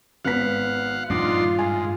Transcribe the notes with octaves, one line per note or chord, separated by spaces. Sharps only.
G#1 B3 F5 F#5 B6
A#1 G2 D#3 D4 F4 C6
G#2 G#5